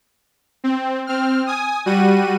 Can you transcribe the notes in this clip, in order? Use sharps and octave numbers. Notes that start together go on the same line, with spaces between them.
C4
C4 F6
G#5 D#6
G3 F#4 D#7